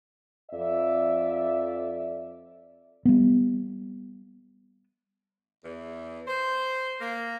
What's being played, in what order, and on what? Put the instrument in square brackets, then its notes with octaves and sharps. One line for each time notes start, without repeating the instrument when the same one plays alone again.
[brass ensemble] F2 D5 E5
[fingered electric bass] G3 B3
[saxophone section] E2
C5
A#3